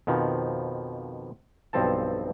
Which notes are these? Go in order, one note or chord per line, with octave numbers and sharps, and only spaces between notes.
F2 B2 D#3 F3
B1 G2 F3 C4 A4 A5